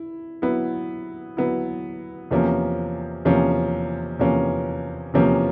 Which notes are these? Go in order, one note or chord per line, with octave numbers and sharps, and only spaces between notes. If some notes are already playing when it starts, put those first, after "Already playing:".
Already playing: E4
F#3 B3 E4
F#3 B3 E4
E2 C3 F3 A#3 C#4
E2 C3 F3 A#3 C#4
E2 C3 F3 A#3 C#4
E2 C3 F3 A#3 C#4